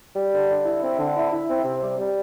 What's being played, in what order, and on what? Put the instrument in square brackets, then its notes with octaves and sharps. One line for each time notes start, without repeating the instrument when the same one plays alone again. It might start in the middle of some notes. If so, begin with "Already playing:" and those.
[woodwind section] G3
D3
D3
E4
C4
D3
E4
E4
C4
C3
G3
G3